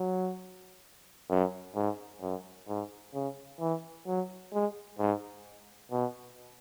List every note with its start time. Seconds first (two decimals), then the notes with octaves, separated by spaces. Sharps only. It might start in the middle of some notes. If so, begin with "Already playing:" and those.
Already playing: F#3
1.30 F#2
1.75 G#2
2.21 F#2
2.68 G#2
3.14 C#3
3.60 E3
4.07 F#3
4.53 G#3
4.99 G#2
5.92 B2